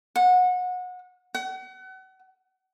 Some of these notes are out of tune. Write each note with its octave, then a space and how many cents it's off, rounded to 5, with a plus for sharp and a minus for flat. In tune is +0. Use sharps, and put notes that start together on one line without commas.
F#5 -25
F#5 +35